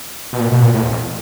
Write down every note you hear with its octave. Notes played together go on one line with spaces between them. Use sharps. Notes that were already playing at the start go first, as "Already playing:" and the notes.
B2
A#2
B2
A#2
A2
E2
F2